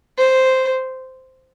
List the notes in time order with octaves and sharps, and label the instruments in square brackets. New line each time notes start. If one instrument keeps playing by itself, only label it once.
[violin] C5